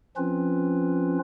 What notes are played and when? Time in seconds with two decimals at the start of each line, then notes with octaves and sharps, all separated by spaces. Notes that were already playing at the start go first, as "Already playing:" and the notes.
0.17 F3 C4 C#4 F4 B4